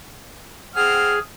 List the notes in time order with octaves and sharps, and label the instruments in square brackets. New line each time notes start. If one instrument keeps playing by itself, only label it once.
[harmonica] C4 F#5 F6 [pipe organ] G#4